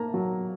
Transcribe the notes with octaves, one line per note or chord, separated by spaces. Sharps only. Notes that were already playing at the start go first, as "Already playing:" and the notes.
Already playing: A#3 A5 A#5
F#3